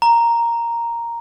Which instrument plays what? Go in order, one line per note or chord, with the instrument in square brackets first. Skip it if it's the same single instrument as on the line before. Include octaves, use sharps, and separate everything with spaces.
[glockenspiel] A#5